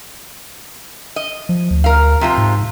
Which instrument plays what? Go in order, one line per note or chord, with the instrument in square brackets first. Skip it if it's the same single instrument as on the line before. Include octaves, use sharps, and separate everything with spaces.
[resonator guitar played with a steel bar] D#5
[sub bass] F3
D2
[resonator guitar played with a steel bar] A#4 F5
C3 F3 F4
[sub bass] G#2